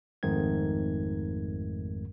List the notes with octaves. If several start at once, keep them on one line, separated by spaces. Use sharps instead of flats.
G#1 F2 G#2 D#3 A3 G#6